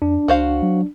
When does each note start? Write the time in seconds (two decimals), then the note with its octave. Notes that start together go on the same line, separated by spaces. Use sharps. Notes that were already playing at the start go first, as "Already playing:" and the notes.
0.02 F2 D4
0.28 C#2 F#4 C5 F5
0.62 F#3